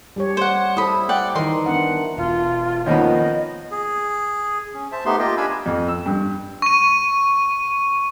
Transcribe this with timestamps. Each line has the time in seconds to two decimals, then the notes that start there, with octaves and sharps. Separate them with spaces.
0.16 G3 G4 C#5
0.37 C5 F#5
0.77 E4 A4 C5 B5 D#6
1.09 D5 F#5 G5
1.35 D#3 E3 D#4 A#4 C6
1.66 B3 D4 F#5
2.17 E1 F4
2.86 D#3 F3 A#3 B3 C#4 D#5
3.71 G#4
4.74 C#4
4.92 C5 E5 A5
5.05 A3 B3 D#4 G4 C6
5.19 A#3 F4 G4 D#5 G5
5.37 D4 G4 F5 G#5 B5 E6
5.66 F2
5.88 E6
6.06 G2
6.62 C#6 D#7